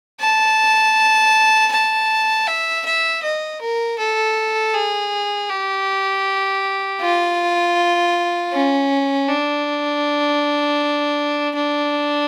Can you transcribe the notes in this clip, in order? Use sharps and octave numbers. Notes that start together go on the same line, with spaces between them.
A5
A5
E5
E5
D#5
A#4
A4
G#4
G4
F4
C#4
D4
D4